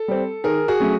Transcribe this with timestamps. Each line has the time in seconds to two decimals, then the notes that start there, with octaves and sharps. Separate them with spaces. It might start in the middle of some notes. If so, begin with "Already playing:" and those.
Already playing: A4
0.08 G3 C4
0.44 D#3 G#4 A#4
0.68 F#4 G#4
0.80 F#3 A3 C#4